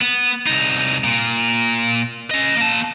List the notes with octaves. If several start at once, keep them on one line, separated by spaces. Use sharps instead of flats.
B3
C2 D#4
A#2
C#4 D#5
A#3 A5